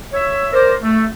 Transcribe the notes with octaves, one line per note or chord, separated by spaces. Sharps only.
C#5 E5
A#4 C5 D5
A3